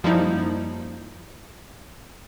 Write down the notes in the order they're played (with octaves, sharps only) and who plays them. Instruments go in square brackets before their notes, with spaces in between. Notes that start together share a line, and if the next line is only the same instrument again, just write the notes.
[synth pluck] F#2 F3 G3 A#3 D#4 E4